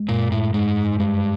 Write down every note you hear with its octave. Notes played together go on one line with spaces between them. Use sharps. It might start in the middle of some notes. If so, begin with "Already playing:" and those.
Already playing: G#3
F#2 A#2
A2
G#2 G#3
G2 G#3